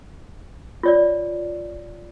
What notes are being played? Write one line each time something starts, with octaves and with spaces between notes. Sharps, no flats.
F4 C#5 D5